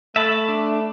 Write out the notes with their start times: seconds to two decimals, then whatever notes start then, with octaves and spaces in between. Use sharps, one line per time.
0.16 A3 E5 A5 B5
0.49 D4